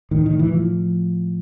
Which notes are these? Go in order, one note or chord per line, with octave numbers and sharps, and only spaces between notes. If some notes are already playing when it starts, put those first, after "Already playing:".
A2 D#3
D#3
E3
F3